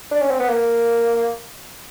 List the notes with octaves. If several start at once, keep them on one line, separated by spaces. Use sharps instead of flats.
D4
C#4
C4
B3
A#3